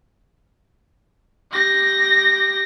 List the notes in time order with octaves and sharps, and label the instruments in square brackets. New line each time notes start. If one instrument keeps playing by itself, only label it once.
[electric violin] G4 A#6